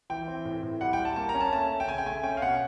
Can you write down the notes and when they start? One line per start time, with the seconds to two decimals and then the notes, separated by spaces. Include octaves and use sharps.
0.10 E3 G5
0.28 C4
0.45 A2
0.63 A2
0.81 G3 F#5
0.93 G5
0.99 G3
1.05 A5
1.16 A#3 A5
1.29 A#5
1.35 C#4
1.41 A5
1.52 A3 A5
1.70 C#4
1.80 G5
1.88 C#3 G#5
1.98 G5
2.06 A3 G#5
2.23 C#4 G5
2.37 F5
2.42 B2 F#5